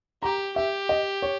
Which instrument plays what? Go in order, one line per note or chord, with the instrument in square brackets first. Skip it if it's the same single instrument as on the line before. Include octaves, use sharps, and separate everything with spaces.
[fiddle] G4 [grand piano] A#5
[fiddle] G4 [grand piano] E5
[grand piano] D#5
C#5